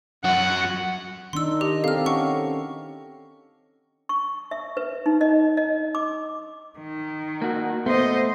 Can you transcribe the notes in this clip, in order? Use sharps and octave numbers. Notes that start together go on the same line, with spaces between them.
F#2 F#4 F#5
D#3 D4 D#4 C6 E6
G4 D#5
C4 G4 A4 F5 F6
C#4 F#5 C#6
C#6
E5
B4
D#4
D#5
D#5
D6
D#3
A#3 F#4
A3 B3 C5 D#5